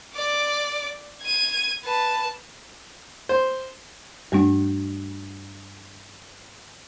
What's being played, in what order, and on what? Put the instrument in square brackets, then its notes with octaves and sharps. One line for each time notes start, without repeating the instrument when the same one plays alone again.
[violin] D5 D6
G#6 D#7
B4 A5
[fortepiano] C5
[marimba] G2 G3 A3 D4